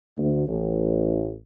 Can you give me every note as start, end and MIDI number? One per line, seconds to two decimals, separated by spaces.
0.18 0.47 38
0.47 1.32 33